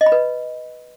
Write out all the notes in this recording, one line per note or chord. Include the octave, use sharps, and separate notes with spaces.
D#5
B5
B4